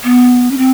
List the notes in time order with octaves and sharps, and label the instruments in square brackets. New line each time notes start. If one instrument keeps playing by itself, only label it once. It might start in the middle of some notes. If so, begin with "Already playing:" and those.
[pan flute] B3
C#4
C4